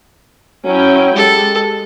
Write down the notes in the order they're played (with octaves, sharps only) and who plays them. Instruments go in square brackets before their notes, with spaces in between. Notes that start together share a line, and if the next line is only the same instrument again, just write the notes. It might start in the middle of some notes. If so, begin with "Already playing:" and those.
[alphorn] F#3 [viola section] C#4 E4 G5
[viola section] G#3 [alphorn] G4 [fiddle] A4